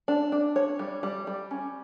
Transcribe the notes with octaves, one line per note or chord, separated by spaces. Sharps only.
D4
D4
C#5
G3
G3
G3
C#4